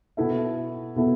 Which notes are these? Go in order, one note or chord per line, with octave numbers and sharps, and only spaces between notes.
B2 B3 E4 A4 E5
B2 B3 E4 A4 E5